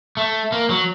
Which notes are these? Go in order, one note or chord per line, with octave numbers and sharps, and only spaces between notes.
A3
A#3
F#3